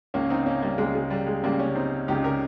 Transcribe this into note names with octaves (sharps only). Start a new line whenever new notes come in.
C#2 C#3 A#3 C#4
C4 D#4
A#3 C#4
G3 A#3
C#2 C#3 G#3
G#3
G3
G#3
C#2 C#3 G3 A#3
A#3 C#4
C4 D#4
C#2 C#3 D#4 G4
G4 A#4